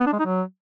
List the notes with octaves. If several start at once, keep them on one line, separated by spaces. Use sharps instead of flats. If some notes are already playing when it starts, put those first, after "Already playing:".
B3
D4
G#3
D#4
F#3